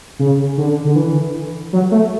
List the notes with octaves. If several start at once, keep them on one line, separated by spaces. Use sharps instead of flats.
C#3
D3
D3
E3
F#3
A3